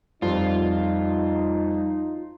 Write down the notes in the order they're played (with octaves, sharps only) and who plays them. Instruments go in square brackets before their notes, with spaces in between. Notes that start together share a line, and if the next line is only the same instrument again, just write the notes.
[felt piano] F2 [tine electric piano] G3 [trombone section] D#4 [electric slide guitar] F4